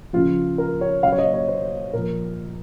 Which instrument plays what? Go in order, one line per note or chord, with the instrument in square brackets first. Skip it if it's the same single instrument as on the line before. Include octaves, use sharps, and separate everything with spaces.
[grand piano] C#3 F3 F4
A#4
C#5
C#3 F#3 F5
C#5
D#5
C#5
C5
A#2 F3 A#4